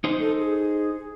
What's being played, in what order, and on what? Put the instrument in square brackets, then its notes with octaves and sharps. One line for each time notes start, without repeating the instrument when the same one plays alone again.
[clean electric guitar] D#4 C5
[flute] A4
G#4